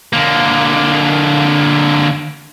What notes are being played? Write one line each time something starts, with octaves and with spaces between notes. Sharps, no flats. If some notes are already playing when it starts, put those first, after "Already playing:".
D3 A#3